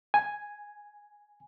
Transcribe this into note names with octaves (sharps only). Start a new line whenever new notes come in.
G#5